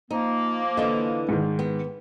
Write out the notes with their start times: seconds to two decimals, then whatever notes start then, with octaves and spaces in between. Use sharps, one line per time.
0.11 F3 A#3 D#4
0.77 D3 E3 D#5
1.29 G#2 D#3
1.59 B3